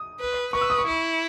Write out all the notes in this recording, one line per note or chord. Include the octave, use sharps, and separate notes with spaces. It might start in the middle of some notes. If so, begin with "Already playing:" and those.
Already playing: D#6
B4
B4 C#6
E6
D#6
C#6
E4